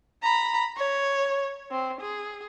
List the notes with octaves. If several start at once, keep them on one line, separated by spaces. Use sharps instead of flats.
A#5 B5
C#5
C4
G#4